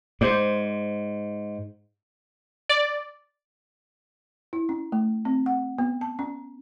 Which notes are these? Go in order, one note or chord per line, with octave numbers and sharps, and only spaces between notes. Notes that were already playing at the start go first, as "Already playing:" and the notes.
G#2 C5 D5
D5
E4
C#4
A3
C4
F#5
B3
A5
C#4